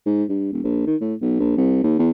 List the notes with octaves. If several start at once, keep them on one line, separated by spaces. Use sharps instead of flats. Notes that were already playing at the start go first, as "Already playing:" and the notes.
G#2
G2
E1
A#1
D#3
A2
B1
A#1
C2
D#2
E2